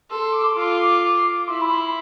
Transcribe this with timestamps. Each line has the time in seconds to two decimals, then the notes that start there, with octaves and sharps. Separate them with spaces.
0.09 A4 C6
0.33 D6
0.43 C6
0.53 F4 D6
1.48 E4 C6
1.62 B5
1.74 C6